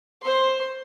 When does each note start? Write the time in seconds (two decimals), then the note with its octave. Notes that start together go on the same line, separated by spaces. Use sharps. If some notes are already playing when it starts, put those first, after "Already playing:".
0.21 C5 C6